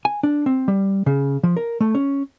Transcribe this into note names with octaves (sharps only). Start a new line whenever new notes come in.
G#5
D4
C4
G3
C#3
F3
A#4
A3
C#4